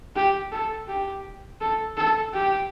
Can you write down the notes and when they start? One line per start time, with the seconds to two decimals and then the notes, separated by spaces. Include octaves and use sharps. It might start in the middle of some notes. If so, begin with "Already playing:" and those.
0.16 G4
0.52 A4
0.88 G4
1.61 A4
1.97 A4
2.34 G4